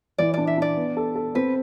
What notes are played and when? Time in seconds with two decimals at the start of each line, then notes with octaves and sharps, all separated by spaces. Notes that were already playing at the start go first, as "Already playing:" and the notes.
0.18 E3 D5
0.34 D4 D5
0.47 E5
0.57 D4 D5
0.77 B3
0.97 A4
1.15 A4
1.35 C4 B4